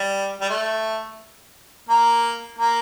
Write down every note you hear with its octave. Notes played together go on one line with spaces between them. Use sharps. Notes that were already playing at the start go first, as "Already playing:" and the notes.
Already playing: G3
G3
A3
A#3
A#3